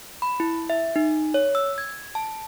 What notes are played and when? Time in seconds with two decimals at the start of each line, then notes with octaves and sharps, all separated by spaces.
0.22 B5
0.40 E4
0.70 E5
0.96 D#4
1.34 C#5
1.55 E6
1.78 G#6
2.15 A5